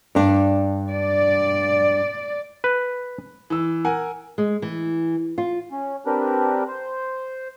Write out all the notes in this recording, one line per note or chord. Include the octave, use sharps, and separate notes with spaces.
G2 D4
D5
B4
E3 E6
A#4 F#5 G#5
G#3
E3
F4
C#4
C4 D4 G4 A#4 B4
C5